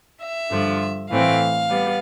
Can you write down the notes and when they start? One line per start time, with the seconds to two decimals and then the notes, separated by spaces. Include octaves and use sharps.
0.22 E5
0.51 G2 D3 F3
1.10 A2 E3 A3 C4 F5
1.69 G3 B3